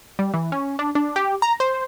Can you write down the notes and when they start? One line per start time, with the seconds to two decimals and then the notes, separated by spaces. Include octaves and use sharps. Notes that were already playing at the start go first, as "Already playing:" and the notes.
0.19 G3
0.34 E3
0.52 C#4
0.79 D4
0.95 D4
1.16 G4
1.42 A#5
1.60 C5